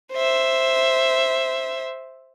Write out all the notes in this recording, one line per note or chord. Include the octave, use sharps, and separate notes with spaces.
C5 E5